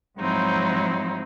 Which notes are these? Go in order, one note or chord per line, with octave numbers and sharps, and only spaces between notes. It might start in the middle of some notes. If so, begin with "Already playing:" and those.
G#2 F3 F#3 C4 D#4 E4